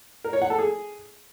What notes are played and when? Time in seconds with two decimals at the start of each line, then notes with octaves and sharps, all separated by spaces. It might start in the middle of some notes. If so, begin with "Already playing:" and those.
0.25 A#4
0.33 C#5
0.42 F#5
0.50 A4
0.59 G#4